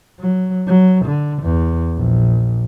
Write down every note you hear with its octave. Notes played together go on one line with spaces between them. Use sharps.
F#3
F#3
D3
E2
A#1